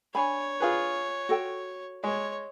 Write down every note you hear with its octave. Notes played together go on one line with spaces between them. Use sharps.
D4 C#5 G#5 B5
F4 G#4 B4
F#4 A4 G5
G#3 C#5